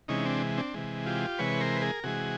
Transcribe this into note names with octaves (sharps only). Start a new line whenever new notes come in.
C3 E3 G#3 C#4 D#4
C4 D4
C4 D4
C3 E3 G#3
F4 G4
C3 E3 G#3 B4 C#5
A#4 C5
B4
G#4 A#4
C3 E3 G#3 F#4 G#4